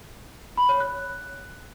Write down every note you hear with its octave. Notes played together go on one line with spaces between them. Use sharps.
B5
C#5
F#6